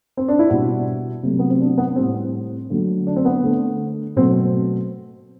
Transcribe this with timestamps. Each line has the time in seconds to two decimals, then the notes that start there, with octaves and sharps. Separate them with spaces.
0.17 C4
0.28 D4
0.39 E4
0.49 B2 G3 F#4
1.23 C3 F#3 A3
1.39 B3
1.50 C4
1.60 D4
1.78 B3
1.96 A2 G3 C4
2.15 C4
2.70 D3 F#3 A3
3.07 D4
3.16 C4
3.25 B3
3.44 D3 A3
4.16 B2 F#3 A3 C4